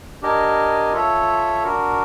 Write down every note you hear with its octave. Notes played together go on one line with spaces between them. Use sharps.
D4 G4 A#4 D#5 G#5
F4 A4 C#5 E5
D4 F#4 A#4